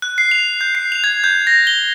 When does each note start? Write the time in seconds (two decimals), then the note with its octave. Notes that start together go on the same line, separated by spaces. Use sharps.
0.02 F#6
0.18 C7
0.31 F7
0.61 G6
0.75 C7
0.92 F7
1.04 G#6
1.24 G6
1.47 A#6
1.67 G7